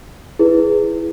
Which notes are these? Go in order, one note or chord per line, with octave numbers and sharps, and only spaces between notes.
E4 G#4 B4